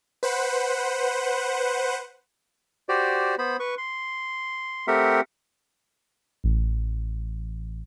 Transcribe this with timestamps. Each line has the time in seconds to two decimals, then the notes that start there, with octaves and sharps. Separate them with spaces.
0.23 B4 C5 F#5
2.89 F#4 G4 C5 D5
3.39 B3 C5 B5
3.60 B4 C#6
3.78 C6
4.88 A3 C4 G4 A#4 E5 F#5
6.44 A1